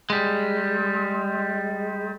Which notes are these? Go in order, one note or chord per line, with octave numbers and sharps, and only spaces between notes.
G3 G#3